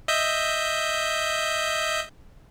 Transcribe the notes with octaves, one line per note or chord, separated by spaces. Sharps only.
D#5 E5 G6